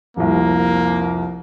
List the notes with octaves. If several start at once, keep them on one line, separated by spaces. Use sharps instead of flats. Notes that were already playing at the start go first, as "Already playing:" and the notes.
F1 C2 A#3